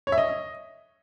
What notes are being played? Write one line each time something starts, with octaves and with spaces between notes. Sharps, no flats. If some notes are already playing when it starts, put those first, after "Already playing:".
C#5
E5
D#5